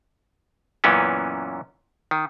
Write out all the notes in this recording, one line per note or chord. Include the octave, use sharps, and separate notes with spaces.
F#2 A#2 E3 B3 C#4
D#3